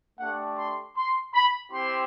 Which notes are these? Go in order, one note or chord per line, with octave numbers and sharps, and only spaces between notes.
A3 D4 G4 F#5
C6
C6
B5
C4 E4 G4 C6